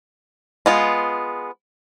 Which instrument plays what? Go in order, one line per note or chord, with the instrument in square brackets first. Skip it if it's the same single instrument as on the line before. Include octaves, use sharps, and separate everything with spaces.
[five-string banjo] G#3 B3 F4